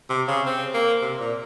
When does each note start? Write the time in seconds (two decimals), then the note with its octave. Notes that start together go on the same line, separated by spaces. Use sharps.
0.10 C3
0.28 C#3
0.46 C4
0.74 A#3
1.02 C3
1.20 A#2